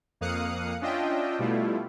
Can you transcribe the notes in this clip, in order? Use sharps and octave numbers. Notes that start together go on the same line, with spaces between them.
F2 A#3 F5 D#6 F#6 C#7
C#4 D4 F4 D#5 E5 G5
B2 G3 A3 E4 F4